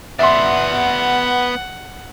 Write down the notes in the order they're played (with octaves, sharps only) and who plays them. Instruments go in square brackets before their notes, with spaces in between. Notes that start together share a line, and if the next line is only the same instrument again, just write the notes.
[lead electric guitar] B3 D5 [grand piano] E5 C6 [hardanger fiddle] F#5